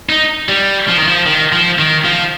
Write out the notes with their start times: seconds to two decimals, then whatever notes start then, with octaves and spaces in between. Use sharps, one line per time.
0.09 D#4
0.49 G3
0.88 F3
0.98 D#3
1.08 F3
1.26 D#3
1.52 F3
1.79 D#3
2.05 F3